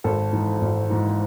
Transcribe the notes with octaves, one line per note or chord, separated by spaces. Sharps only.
G#1 A4
G#2 E3
G#1
G#2 E3